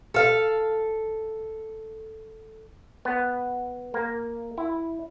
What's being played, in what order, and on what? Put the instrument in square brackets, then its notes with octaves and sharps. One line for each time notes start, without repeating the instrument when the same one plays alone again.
[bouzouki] A4 F5
[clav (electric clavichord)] B3
A#3
E4